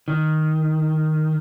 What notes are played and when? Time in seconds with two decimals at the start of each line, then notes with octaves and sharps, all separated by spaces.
0.08 D#3